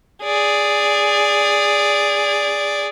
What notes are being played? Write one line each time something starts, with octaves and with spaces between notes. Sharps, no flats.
G#4 D5